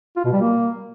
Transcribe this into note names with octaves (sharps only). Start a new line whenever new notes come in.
F4
B2
G3
A#3